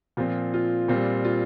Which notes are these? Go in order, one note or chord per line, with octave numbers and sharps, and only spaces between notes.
A#2 F3 C4
F4
A#2 G3 C4
F4